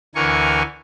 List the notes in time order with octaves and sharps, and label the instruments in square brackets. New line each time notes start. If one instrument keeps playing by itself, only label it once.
[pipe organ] D2 D3 E3 A#4 G#5 C#6